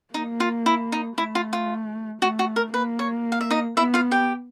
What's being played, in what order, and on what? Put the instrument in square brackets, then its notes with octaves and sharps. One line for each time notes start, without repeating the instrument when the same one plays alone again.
[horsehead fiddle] A#3 [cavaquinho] D#4
[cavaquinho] F4
E4
D#4
[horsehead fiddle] A3 [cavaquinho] E4
[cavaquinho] F4
F4
[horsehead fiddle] A3 [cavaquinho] F#4
[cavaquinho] F#4
A#4
[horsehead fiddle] A#3 [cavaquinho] B4
[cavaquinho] C#5
F5
E5
D#4 D#5
[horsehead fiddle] B3 [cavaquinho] E4 E5
[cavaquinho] F4 F5
G4 G5